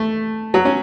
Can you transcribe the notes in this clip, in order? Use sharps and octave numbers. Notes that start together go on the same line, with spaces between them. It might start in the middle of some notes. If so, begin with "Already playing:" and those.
Already playing: A3
F#3
C#4